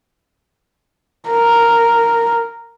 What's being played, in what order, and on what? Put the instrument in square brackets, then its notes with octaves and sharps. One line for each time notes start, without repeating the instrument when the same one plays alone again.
[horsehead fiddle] A#4